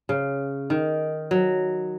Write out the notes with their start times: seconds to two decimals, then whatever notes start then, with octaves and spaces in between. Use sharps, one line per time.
0.09 C#3
0.70 D#3
1.31 F#3